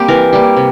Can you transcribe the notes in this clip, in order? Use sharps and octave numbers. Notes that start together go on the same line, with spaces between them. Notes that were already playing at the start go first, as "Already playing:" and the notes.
Already playing: G3 A#3 C4 G4
E3 A#4
G3 A#3
C3